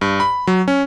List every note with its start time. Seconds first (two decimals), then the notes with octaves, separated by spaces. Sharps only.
0.01 G2
0.20 B5
0.47 F#3
0.68 C#4